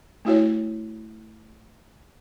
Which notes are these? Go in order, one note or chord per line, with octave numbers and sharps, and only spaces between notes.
A3 E4 F#4 C#5